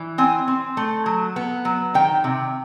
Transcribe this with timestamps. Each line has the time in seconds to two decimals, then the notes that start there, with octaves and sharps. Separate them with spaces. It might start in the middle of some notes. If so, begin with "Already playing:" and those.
Already playing: E3
0.18 C4 G#5
0.48 C4
0.77 A3
1.06 F#3
1.36 B3
1.65 F#3
1.94 D#3 G5
2.24 C3